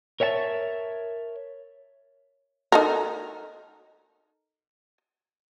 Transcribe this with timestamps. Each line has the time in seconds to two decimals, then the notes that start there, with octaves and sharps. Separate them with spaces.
0.20 A#4 C#5 E5 F#5 A5
2.72 D#4 A4 A#4